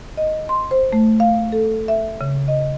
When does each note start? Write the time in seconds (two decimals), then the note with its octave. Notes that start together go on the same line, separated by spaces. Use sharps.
0.17 D#5
0.49 C6
0.71 C5
0.93 A3
1.20 F5
1.52 A4
1.88 E5
2.21 C#3
2.48 D#5